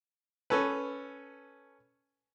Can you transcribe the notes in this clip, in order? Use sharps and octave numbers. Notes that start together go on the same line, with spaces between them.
C#4 A4 B4